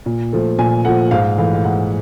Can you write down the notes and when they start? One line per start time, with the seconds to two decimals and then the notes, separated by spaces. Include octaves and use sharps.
0.06 A#2
0.33 F3 A3
0.59 A#2 G#5
0.85 F3 A3 F#5
1.11 G#2 F5
1.38 E3 A3 F5
1.54 F5
1.64 G#2 F#5